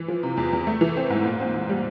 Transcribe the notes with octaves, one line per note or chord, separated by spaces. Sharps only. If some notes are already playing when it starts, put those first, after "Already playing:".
Already playing: E3
F3
C3
E2
E2
A3
E3
C4
G#2
A#2
C4
A#2
G3